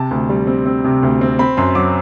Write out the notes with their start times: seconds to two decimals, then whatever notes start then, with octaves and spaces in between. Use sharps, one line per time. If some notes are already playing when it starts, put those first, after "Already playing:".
Already playing: C3 A5
0.11 D2
0.29 G3
0.47 C4
0.66 C4
0.84 C3
1.03 D2
1.21 C4
1.39 C4 B5
1.57 F#2 C6
1.75 F#3 D6